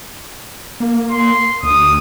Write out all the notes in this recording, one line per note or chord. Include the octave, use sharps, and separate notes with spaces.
A#3
C6
D2 D#6